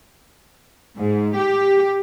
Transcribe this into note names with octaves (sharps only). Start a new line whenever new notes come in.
G#2
G4